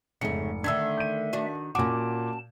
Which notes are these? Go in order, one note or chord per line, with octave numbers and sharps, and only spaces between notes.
F1 G#2 C#3 A3 C#7
D3 D#3 A3 D4 E5 E6 G#6
G6 D#7
D#3 D4 F#4
A#2 C#4 F#4 A5 D6